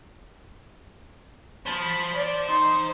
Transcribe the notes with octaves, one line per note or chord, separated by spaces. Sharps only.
C5 A5 B5
D5
D#4 C6